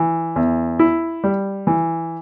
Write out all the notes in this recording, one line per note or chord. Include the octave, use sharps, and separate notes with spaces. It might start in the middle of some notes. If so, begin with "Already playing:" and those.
Already playing: E3
E2
E4
G3
E3